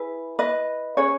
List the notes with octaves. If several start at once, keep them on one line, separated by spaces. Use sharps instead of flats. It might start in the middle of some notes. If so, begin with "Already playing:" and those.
Already playing: E4 G#4 B4
B4 D#5
C#4 G#4 B4 C#5